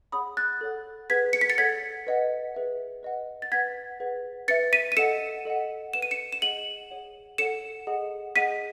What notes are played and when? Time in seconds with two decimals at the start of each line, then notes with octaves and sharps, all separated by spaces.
0.12 G#4 C#5 F#5 B5 D#6
0.37 F#6 A6
0.61 A4 C#5 F#5
1.10 G#4 B4 F#5 G#6 B6
1.33 C#7
1.41 B6
1.50 A6 C#7
1.58 A4 C#5 F#5 G#6 B6
2.07 B4 D#5 F#5
2.55 G#4 B4 E5
3.03 B4 D#5 F#5
3.42 A6
3.52 B4 F#5 G#6 B6
4.00 G#4 B4 F#5
4.48 B4 E5 A6 C#7
4.73 B6 D#7
4.92 D#7
4.97 A4 D#5 F#5 C#7 E7
5.45 A4 D#5 F#5
5.94 B4 F#5 E7
6.02 D#7
6.11 C#7 E7
6.33 E7
6.42 G#4 D#5 F#5 D#7 F#7
6.90 G#4 C#5 F#5
7.38 A4 C#5 F#5 C#7 E7
7.87 G#4 D#5 F#5
8.36 G#4 D#5 F#5 B6 D#7